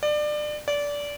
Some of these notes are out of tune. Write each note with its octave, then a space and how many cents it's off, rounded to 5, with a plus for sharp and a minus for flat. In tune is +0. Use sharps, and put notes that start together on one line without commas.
D5 +25
D5 -20